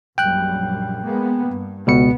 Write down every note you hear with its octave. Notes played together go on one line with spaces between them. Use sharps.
A#1 F#2 G3 G5 F#6
G#3 A#3 B3
G2
C#2 B2 B3 C#7